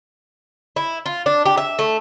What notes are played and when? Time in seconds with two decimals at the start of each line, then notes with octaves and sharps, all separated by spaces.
0.76 E4
1.06 F4
1.26 D4
1.46 G4
1.57 E5
1.79 A3